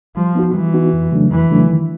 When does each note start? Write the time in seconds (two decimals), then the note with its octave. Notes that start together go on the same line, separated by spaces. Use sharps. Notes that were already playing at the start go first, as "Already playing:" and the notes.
0.16 F3 G3
0.35 B3 D#4 F#4
0.55 E3 G3
0.74 B3 D#4 F#4
0.93 F2
1.12 C#3 F#3 A3 D4
1.31 F2 E3
1.50 C#3 F#3 A3 D4
1.69 D#3